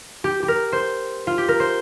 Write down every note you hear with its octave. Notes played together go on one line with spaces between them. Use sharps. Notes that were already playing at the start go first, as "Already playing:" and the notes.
G4
G4
A#4
C5
F4
G4
A#4
C5